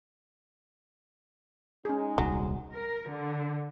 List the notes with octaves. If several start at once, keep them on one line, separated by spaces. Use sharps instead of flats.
G#3 C#4 D#4 G#4
D#1 C2 F#3
A#4
D3